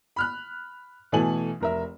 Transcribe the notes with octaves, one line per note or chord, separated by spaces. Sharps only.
B5 F6 F#6
B2 E3 A3 A4 G#5 F#7
F1 A#4 E5